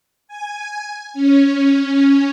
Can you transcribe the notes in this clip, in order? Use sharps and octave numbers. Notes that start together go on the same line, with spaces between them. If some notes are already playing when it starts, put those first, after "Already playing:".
G#5
C#4